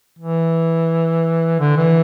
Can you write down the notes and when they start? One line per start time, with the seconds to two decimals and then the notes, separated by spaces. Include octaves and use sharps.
0.19 E3
1.60 D3
1.77 E3